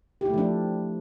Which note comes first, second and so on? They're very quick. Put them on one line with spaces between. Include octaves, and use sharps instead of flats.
G4 E4 A3 F3 D4